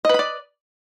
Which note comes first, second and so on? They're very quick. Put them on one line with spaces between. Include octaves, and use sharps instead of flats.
D#5 B4 B5 D5